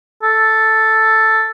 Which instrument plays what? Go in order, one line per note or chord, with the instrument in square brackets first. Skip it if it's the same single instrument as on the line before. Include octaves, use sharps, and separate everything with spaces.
[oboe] A4